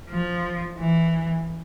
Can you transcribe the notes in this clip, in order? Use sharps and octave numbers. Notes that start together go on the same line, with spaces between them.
F3
E3